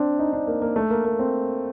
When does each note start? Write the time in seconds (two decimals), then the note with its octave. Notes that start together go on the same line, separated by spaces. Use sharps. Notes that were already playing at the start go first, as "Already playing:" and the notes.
Already playing: C4 D4
0.19 D#4
0.33 D4
0.47 A#3
0.62 A#3
0.76 A3
0.91 A#3
1.05 A#3
1.19 C4